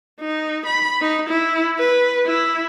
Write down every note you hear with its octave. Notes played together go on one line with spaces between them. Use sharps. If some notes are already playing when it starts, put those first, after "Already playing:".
D#4
B5
D#4
E4
B4
E4